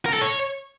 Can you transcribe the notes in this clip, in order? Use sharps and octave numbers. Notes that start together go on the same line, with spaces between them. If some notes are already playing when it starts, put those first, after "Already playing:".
A#4
A4
C#5